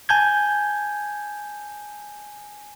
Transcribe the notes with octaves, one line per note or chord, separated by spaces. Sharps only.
G#5 A5 G6 G#6